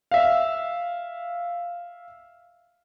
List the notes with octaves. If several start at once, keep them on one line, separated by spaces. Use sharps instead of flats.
E5 F5